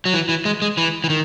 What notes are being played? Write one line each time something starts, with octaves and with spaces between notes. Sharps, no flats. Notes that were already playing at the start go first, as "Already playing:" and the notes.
F#3
E3
E3
G#3
G#3
E3
E3
D#3